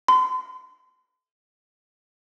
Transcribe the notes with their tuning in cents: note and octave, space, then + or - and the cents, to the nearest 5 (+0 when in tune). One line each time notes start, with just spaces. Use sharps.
C6 -40